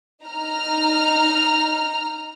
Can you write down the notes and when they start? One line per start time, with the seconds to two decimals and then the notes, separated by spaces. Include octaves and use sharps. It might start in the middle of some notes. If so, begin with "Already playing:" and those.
0.24 D#4 A#5 F6